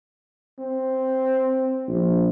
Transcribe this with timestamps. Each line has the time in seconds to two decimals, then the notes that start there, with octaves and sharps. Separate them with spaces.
0.59 C4
1.89 A#1